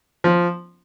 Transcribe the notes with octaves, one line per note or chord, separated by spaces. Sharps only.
F3